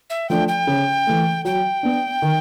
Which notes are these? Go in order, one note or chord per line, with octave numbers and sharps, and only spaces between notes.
E5
F3 A3 D4 G5
G5
C#3
E3 A3
F#3 G5
B3 D4
D#3